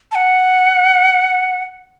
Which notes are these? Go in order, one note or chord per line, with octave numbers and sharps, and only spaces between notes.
A5
F#5